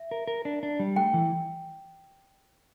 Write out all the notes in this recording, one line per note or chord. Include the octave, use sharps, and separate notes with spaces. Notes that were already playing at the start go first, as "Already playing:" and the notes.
Already playing: E5
A#4
A#4
D4
D4
G3
A3 G5
E3